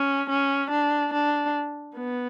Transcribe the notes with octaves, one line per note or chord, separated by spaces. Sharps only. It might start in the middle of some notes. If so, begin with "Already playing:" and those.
Already playing: C#4
C#4
D4
D4
B3